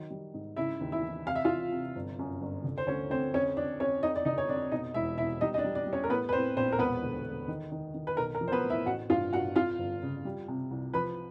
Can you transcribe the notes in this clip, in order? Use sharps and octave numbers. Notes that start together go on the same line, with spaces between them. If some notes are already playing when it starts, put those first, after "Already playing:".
Already playing: D#3 F#3
G3
G#2
C#3 E4 E5
D#2
E4 E5
E3
C3 F5
E5
E3 F4 F5
C3
G1
F#2
G1
D3
C5
D2 C#4 C#5
D2 C4 C5
F2 C#4 C#5
F2 D4 D5
F2 C#4 C#5
F2 D#4 D#5
D5
D3 D#4 D#5
C#5
F2 D4 D5
B2 D#4 D#5
E1 E4 E5
B2 E4 E5
G3 D#4 D#5
D#5
D4 D5
G3
D4 D5
G3
C#4 C#5
A#4
A2 B3 B4
B4
A2 C4 C5
A#1 C4 C5
A#4
E1 B3 B4
D2
D2
D#3
D#3
D#3
B4
B1 A#4
A#4
F3
C5
B3 B4
A2
E4 E5
A1 F#4 F#5
G2 F4 F5
G2 F#4 F#5
F2 F4 F5
G1
C#3
G3
C3
C2
F3 B4 B5